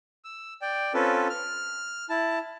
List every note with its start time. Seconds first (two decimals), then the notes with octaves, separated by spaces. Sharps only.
0.24 E6
0.62 D5 G5
0.94 C4 C#4 F4 A4 B4
1.30 F6
2.09 E4 A5